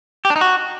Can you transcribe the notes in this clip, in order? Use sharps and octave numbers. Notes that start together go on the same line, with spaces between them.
G4
D4
D#4
F#4